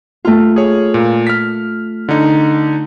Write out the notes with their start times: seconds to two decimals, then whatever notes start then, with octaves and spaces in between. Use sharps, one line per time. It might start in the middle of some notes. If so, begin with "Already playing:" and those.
0.25 A3 F4
0.56 G#4 C#5
0.94 A#2
1.27 F6 B6
2.09 D3 D#4